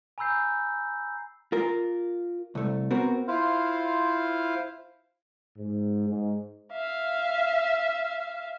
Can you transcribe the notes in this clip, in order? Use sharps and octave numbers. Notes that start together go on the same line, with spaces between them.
G#5 A#5 B5 E6 G6 C7
F4 A#4
C2 A3
B3 C4 F#4 A#4
E4 F4 C5 F5
G#2
G#2
E5 F5